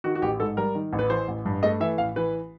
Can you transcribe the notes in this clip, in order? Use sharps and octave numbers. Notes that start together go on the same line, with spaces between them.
D#3 F#4
F#4
A1 G4
G#2 A4
G3 A#4
D#3
A1
B4
E3 C5
A1
G2
A3 D#5
E3 E5
A1 F5
E3 B4